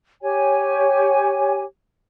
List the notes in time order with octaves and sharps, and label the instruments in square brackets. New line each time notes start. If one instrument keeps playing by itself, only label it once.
[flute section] G4 C#5 G#5